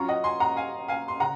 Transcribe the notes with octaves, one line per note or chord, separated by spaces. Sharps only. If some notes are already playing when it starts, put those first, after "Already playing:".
Already playing: F#3 C#4 F4 A#5 C#6
D#5 F#5
G#5 C6
F#5 A#5
F5 G#5
F5 G#5
C6
C#3 F#5 A#5